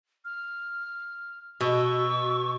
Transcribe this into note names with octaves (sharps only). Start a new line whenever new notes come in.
F6
B2 C#6 E6